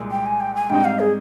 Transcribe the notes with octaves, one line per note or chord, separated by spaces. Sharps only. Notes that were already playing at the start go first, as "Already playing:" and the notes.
Already playing: C2 A#2 G#3
G5
G#5
G5
G#5
G#2 G3 C4 D#4 G5
F5
G#4